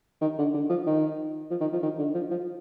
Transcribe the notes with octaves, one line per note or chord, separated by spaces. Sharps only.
D#3
D3
D3
F3
D#3
F3
D#3
F3
D#3
D3
F3
F3